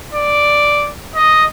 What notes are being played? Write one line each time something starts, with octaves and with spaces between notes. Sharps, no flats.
D5
D#5